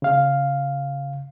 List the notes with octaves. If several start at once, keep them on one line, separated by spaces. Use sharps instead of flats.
C#3 F5